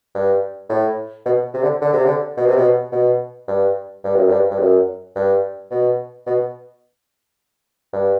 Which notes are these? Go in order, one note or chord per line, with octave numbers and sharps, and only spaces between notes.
G2
A2
B2
C3
D3
D3
C3
D3
B2
C3
B2
B2
G2
G2
F#2
G2
G2
F#2
G2
B2
B2
G2